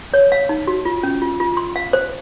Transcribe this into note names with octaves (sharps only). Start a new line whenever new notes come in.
C#5
F5
D#4
F#4
F4
C#4
F4
F4
C6
F5
C5